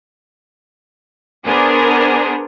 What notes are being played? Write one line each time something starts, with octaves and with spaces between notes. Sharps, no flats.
B3 D4 G#4 A#4 C5